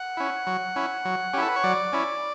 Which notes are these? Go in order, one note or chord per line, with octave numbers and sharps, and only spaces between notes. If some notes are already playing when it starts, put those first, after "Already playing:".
Already playing: F#5
C#4 E4
F#3
C#4 E4
F#3
C#4 E4 G4 A4
B4
C#5
F#3 D5
C#4 E4